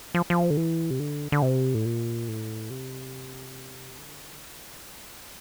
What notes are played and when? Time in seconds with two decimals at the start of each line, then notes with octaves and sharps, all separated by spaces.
0.15 F3
0.30 F3
0.50 D3
0.57 E3
0.91 C3
0.99 D3
1.32 D3
1.42 C3
1.74 A2
1.85 A#2
2.28 A2
2.70 C3
3.98 D3